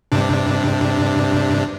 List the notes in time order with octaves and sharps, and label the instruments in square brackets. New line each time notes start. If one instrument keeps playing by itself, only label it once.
[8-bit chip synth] G2 C3 D4